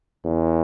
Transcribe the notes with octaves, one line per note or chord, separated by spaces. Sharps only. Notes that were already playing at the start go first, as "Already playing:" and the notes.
E2